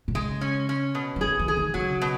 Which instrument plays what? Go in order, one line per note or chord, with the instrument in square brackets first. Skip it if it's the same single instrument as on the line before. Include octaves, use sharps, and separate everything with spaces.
[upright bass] B2
[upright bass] C#3 [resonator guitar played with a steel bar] G#3
[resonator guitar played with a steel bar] C#4
C#4
B2
[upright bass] E3
[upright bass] D#3 [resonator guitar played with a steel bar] G#4
[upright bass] E3
[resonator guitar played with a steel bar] G#4
[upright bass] D#3
[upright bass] C#3 [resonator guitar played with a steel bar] F#3
[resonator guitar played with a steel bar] B2